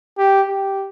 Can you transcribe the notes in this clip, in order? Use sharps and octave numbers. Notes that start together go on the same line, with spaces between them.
G4
G4